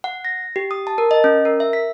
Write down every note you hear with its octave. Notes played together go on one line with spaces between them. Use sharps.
F#5
A#6
G4
D#6
A5
A#4
D#5
C#4
A#4
E5
B6